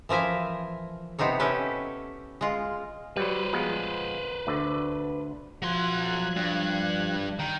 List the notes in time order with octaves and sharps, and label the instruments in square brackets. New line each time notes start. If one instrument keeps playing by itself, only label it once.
[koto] E3 F3 A#4 E5 G#5
C3 B3 C4 D#4 C#5
C#4 E4 G4 A4 B4
G#3 F4
[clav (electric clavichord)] F#3 G3 [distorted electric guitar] B4 C5
[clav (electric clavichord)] F3 G#3 B3
D2 D3
[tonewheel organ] F3 F#6 G#6 [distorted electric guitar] F#3 C6
[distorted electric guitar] G2
D#3